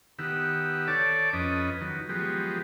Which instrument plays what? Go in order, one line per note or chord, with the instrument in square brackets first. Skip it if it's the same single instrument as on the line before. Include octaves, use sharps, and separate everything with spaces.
[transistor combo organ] D#3 B3 G4 F#5 E6
A4 C#5 D5 A5 D6
F2 C#4 B4 D#5
D#3 F#3
F3 F#3 G#3 B3 G4